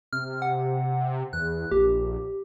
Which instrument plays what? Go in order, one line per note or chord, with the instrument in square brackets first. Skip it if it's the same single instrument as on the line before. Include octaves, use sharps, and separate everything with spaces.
[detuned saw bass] C3 [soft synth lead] F6
[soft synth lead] F#5
[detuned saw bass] E2 [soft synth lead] F#6
[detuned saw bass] A#1 [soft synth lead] G4